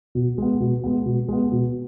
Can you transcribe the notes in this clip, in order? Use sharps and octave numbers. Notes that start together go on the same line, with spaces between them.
B2
G#3 B3
B2
G#3 B3
B2
G#3 B3
B2